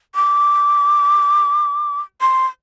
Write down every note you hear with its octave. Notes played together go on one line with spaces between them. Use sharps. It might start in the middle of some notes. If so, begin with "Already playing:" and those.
D6
C6